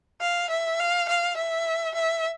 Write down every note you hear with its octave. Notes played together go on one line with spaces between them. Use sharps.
F5
E5
F5
F5
E5
E5